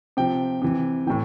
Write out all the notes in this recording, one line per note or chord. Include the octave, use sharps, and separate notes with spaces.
C3 F3 G5
C3 E3
A2 E3 G5